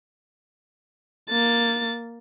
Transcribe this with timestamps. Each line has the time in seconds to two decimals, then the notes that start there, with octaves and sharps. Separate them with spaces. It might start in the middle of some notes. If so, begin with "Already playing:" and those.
1.30 A#3 A6